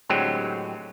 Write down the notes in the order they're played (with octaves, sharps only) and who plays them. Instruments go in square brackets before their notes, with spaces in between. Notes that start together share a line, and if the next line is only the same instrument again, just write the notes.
[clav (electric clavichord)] A2 D3 F#3 G#3 C4 G4